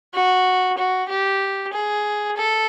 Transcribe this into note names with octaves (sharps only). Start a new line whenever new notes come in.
F#4
F#4
G4
G#4
A4